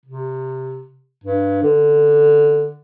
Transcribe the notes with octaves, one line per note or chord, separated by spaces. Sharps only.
C3
G2
D3